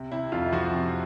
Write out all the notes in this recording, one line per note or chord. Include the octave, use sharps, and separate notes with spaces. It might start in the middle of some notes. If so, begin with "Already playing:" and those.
Already playing: C3
C3 E4
F2 F4
F3 F#4
C3